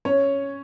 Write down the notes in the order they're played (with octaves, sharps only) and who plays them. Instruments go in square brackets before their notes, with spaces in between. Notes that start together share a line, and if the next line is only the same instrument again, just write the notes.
[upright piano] C#4 C#5